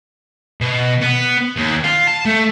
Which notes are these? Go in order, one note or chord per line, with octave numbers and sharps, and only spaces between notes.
B2
B3
D#2
F4
A5
A3